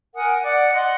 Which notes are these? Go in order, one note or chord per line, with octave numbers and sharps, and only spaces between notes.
A#4 F#5 G#5 D#6
D5 F#5 D6
D#5 F#5 C6 F#6